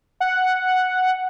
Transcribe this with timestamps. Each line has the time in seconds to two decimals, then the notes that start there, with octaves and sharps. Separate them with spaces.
0.20 F#5